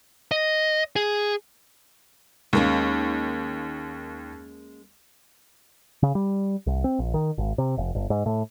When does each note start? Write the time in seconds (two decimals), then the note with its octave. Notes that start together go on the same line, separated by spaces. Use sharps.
0.32 D#5
0.96 G#4
2.53 D#2 G#3 A#3 C#4
6.03 C#3
6.15 G3
6.67 C2
6.84 C4
6.99 A#1
7.14 D#3
7.38 G#1
7.58 C3
7.77 F1
7.95 G1
8.10 G#2
8.26 A2